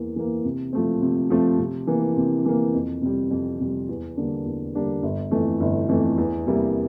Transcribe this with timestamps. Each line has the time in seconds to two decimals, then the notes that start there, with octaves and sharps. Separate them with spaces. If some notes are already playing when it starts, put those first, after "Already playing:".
Already playing: E2 E3 A#3
0.16 E3 A#3
0.44 C3
0.73 F3 A3 C4
1.01 C3
1.30 F3 A3 C4
1.59 C3
1.87 E3 A#3
2.17 C3
2.45 E3 A#3
2.74 F2
3.02 C3 G3
3.31 F2
3.60 C3 G3
3.88 E2
4.17 D3 G3 A#3 D4
4.46 E2
4.75 D3 G3 A#3 D4
5.03 G1
5.31 F2 E3 A3
5.60 G1
5.89 F2 E3 A3
6.18 E2
6.46 C3 G3 A#3 E4